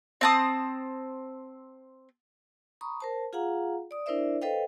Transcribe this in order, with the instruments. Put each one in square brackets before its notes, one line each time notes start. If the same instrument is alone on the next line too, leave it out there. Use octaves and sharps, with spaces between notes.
[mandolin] C4 A5 D#6
[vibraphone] A#5 B5 C#6 D#6
A#4 C5 A5
F4 G#4 F5 F#5 A#5
D5 D#6
D4 E4 A#4 C5 D5 E5
A4 B4 C5 D#5 F5 G5